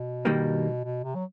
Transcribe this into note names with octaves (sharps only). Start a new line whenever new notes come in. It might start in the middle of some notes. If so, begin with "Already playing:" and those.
Already playing: B2
G2 D#3 G3 A#3
B2
C3
F#3